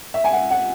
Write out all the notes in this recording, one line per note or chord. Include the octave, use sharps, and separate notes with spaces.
E5
G#5
F#5
F#5